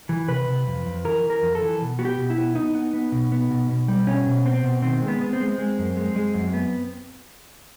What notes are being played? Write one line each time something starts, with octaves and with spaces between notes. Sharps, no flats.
E3
C3 B4
C3
F2
F2
E3 A#4
E3
A#4
F2
A4
E3
B2
B3 F#4
G4
B2
E4
B3
B3 D#4
B3
B3
B2
B3
B2
B2
G3
B2 C#4
B2
B3 C4
B2
D#3 C4
G#3
B3
B3
C4
G#3
G#3
F#2
G#3
G#3
F#2
B3